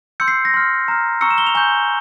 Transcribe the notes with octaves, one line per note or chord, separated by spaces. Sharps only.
C6 E6 G6 C#7
C7
A#6
C6 F6
A#5 F6
A#5 C#6 E6 C#7
E7
G7
F7
G#5 C#6 G6 G7